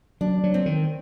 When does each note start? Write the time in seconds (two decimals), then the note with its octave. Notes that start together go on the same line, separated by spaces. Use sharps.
0.21 F#3 D4
0.44 F#3
0.54 C4
0.66 D#3